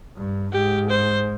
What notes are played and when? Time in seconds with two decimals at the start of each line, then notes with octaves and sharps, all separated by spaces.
0.17 G2
0.53 G#2 G4
0.90 C5